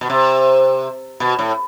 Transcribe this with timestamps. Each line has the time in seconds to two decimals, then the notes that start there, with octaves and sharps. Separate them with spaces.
0.01 B2
0.10 C3
1.20 B2
1.39 A2